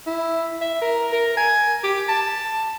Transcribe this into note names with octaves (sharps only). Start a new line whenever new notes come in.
E4
E5
A#4
A#4
G#5
G4
A5